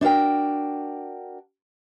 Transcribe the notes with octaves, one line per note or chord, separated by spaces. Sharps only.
D4 D#4 F#4 A#4 G5